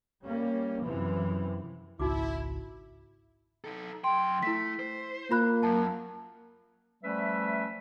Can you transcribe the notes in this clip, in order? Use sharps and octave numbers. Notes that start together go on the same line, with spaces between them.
G3 A#3 C#4
F#2 C3 E3 F3
G#1 C#2 D#4 E4 F#4 D6
D#4 A4
F#2 G5 C6
A3 E4 B6
C5
A#3 F4 B5 F#6
F#2 A5
F3 G3 A3 C#4 B4 E5